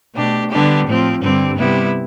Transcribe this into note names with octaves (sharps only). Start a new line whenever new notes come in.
B2 A3 D4 G4
D3 G3 B3 D4 G4
A2 F3 C4
G2 D3 G3 C4
C3 G3 B3 E4